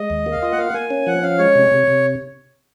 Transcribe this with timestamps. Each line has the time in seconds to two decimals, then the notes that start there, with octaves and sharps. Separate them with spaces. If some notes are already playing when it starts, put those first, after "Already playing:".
Already playing: G#3 D#5
0.10 D#2
0.26 A#3
0.32 F5
0.42 F4 D#5
0.52 F#5
0.58 A#3 F5
0.68 F#5
0.74 A#3 G#5
0.90 C#4
1.07 F3 F#5
1.23 C#4 F5
1.38 G#3 C#5
1.55 C3
1.72 C3
1.87 C3